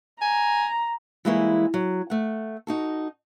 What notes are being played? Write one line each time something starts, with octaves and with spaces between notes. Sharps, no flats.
G#5 A#5
E3 G3 G#3 A#3 E4 C#5
F#3
A3 F#5
D#4 F#4 A4